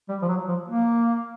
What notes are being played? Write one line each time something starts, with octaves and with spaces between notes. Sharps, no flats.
G3
F3
F#3
F3
A#3